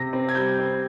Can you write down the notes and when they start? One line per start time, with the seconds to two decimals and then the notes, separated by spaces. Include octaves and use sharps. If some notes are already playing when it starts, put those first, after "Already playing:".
Already playing: C3 A#6
0.13 C4
0.29 G#6
0.35 G3 G6
0.58 C4